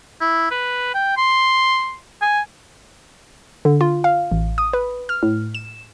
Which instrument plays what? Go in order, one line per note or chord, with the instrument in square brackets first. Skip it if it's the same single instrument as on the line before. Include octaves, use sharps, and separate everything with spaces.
[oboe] E4
B4
G5
C6
G#5
[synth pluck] D3
F4
F5
A1
D#6
B4
F6
A2
E7